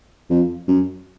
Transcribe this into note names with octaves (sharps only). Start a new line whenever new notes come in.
F2
F#2